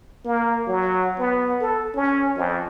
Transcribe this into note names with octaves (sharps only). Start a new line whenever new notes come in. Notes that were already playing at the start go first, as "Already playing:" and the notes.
A#3
F#3
B3
A4
C#4
F2